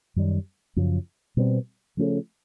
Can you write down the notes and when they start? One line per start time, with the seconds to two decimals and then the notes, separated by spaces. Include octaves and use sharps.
0.16 F#2 D#3 G3
0.76 F#2 C#3 F3
1.37 B2 G3 C4
1.97 C#3 F3 A3 C#4